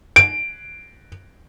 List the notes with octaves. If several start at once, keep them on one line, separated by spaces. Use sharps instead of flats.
D7